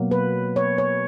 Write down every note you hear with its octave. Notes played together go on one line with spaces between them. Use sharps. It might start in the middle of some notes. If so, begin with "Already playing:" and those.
Already playing: B2 F#3 A#3
B4
C#5
C#5